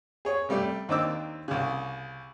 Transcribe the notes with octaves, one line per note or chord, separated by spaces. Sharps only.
G#4 C#5
C3 G3 A3 D5
D#2 C4 D4 D#4 D6 E6
C2 C#3